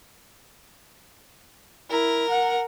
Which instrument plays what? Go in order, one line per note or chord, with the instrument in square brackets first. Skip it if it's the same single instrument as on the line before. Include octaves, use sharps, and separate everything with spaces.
[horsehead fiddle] E4 [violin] A#4
[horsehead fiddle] F#5